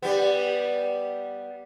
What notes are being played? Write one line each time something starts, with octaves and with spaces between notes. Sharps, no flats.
G3 B3